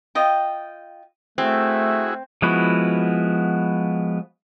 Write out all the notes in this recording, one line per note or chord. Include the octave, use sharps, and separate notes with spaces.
F4 D#5 G5
A3 C4 E4 F#4 G#4
F3 G#3 B3 E4 F#4